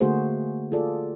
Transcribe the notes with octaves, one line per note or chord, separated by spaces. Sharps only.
D3 A3 A#3 F#4 G#4 C5
F4 G#4 A4 D5